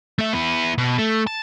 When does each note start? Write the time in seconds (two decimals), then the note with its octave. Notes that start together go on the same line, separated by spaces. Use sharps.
0.19 A3 E5
0.33 B3 E4
0.78 B2
0.99 A3
1.27 A5